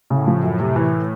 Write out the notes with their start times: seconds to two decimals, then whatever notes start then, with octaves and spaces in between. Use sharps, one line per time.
0.10 A2 C#3
0.27 F3
0.43 F#2
0.60 C3
0.76 E3